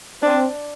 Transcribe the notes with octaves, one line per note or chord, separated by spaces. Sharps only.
C4 D4